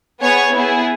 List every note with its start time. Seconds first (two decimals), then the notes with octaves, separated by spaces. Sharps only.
0.22 B3 G#4 C#5
0.55 B3 E4 G#4